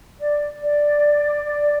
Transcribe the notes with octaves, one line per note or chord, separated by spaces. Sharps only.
D5
D5